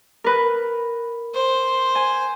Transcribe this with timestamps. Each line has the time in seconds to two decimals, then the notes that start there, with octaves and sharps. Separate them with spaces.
0.24 A#4 B4
1.34 C5
1.95 G#5